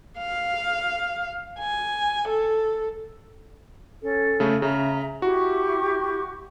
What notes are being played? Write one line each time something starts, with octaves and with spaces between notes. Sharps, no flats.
F5
G#5
A4
C#4 A4
C#3 A3
C#3 E5 A#5
E4 F#4 G4 C#6